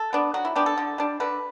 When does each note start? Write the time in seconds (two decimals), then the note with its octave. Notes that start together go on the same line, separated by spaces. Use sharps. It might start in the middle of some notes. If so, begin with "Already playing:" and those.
Already playing: A4
0.13 B3 D4
0.34 F#3 F#4
0.45 E4
0.56 B3 D4 G4
0.66 A4
0.77 D3
0.98 G3 D4
1.20 D3 B4